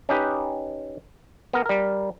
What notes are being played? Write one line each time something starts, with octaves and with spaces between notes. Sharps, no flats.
C#4 D#4 G4 B4
B3 A#4
G3 A#4